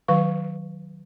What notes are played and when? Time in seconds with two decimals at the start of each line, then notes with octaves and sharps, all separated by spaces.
0.08 D#3 F#3 B4 F5 C#6